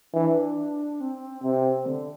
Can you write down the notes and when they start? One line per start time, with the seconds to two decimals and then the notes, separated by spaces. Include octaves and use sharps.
0.14 E3 D4
1.01 C4
1.44 C3
1.86 D3